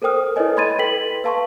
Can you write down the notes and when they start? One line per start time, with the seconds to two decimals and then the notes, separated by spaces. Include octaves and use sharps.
0.02 A4 A#4 C5 G5 D#6 F6
0.36 E4 A4 B4 C#5 D#5 G#5
0.57 D#5 B5 C6 G#6 A6 D#7
0.78 A4 B4 G5 B6 F#7
1.24 B4 F5 A5 C6 C#6